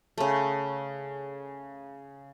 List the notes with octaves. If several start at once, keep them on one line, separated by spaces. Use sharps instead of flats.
C#3 A3